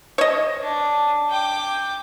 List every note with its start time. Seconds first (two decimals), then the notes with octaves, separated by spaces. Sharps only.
0.18 C#5 D#5
0.61 D4
1.29 G5 D6